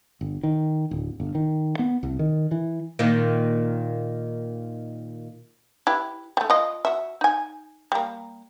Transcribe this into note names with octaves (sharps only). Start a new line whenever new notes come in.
G1
D#3
D1
G1
D#3
B3
C2
D#3
E3
A#2 D#3
E4 G4 B4
G3 A3
F4 D#5
F#4 E5
D#4 G#5
G3 A#3